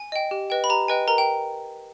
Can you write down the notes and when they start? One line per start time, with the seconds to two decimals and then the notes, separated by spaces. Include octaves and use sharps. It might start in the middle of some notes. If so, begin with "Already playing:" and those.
Already playing: G#5
0.12 D#5 G5
0.31 G4
0.50 B4 D#5 G5
0.64 B5
0.70 G4 A#5
0.88 B4 D#5 G5 G#5
1.08 A#4 A#5
1.18 G5